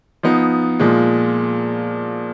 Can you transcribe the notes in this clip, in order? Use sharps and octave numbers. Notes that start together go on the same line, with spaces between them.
F3 B3 D#4
A#2 F3 G#3